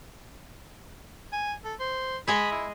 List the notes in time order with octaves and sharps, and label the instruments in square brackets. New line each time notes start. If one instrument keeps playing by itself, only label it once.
[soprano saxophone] G#5
A4
C5
[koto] G#3 G#4 D#5 [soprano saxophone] B5
[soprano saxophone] E4